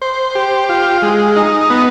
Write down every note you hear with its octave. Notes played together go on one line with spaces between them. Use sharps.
C5
G4
F4
G#3
D#4
B3